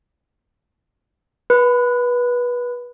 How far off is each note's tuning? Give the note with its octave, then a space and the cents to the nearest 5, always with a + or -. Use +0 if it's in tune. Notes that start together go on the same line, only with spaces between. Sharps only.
B4 -20 B5 +25